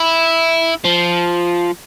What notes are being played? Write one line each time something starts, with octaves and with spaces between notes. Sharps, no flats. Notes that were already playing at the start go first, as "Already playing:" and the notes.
Already playing: E4
F3